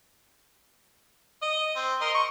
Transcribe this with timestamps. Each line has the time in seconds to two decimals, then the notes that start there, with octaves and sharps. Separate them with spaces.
1.42 D#5
1.76 C4
2.01 A#4 D#5 C6
2.15 C#6